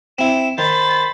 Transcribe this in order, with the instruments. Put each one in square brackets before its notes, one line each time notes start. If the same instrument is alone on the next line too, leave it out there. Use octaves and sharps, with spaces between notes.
[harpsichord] C4 E4 [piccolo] E7
[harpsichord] D#3 [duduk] C5 [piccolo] B5 [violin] A6